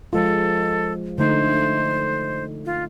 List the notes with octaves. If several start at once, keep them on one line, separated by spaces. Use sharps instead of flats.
F3 G#3 F4 A4
D3 A3 D#4 C5
F4